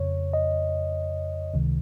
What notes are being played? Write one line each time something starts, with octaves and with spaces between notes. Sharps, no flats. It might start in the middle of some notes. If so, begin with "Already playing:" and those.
Already playing: F2 C#3 C#5
D#5
C#2 C3 D#3